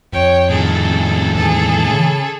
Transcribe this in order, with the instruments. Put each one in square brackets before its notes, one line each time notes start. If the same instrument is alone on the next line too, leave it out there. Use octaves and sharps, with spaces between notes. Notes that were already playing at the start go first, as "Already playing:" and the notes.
[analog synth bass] F2 [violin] C#5 G5
[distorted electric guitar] A2 D#3 [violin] G#4 A4
[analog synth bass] E2 [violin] G#4 A4
[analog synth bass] C#3